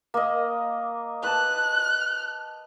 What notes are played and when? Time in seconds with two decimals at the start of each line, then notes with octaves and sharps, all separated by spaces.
0.14 A#3 D#5
1.23 B4 A5 F#6